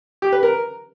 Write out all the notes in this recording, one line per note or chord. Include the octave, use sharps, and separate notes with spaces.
G4
B4
A#4